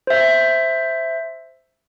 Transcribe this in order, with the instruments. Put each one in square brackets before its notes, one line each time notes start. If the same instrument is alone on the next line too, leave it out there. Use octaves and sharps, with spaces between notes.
[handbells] C5 E5